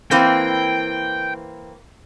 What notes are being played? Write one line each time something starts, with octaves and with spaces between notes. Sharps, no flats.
E3 A#3 C4 G5